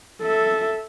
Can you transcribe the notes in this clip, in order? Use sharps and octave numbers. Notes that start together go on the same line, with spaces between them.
A4 E5